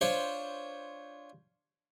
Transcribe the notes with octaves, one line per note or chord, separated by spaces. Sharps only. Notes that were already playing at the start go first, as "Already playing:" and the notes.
D4 F4 C5 C#5